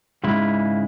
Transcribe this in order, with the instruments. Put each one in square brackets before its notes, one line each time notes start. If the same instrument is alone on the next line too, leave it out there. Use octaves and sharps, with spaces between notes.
[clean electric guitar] G#2 C#3 G#3 E4